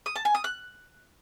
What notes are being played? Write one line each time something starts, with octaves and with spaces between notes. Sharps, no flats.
D#6
A5
G#5
D#6
F#6